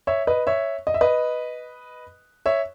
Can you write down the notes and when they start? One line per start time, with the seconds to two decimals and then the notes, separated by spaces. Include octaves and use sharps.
0.07 C#5 E5
0.27 B4 D#5
0.47 C#5 E5
0.87 D#5
0.94 E5
1.01 B4 D#5
2.46 C#5 E5